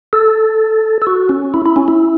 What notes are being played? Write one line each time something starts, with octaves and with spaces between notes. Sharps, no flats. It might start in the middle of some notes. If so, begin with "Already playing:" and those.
A4
A4
F#4
C#4
E4
E4
C#4
E4